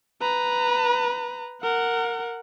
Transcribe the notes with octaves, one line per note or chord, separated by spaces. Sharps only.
B4 A#5
A#4 F#5